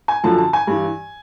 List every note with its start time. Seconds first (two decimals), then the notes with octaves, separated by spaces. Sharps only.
0.08 G#5
0.24 F#2 D3 F3 A5
0.38 A5
0.53 G#5
0.67 G2 E3